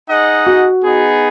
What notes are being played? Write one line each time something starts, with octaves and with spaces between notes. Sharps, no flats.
D#4 G#4 D#5 F#5
F#4
B3 D#4 G#4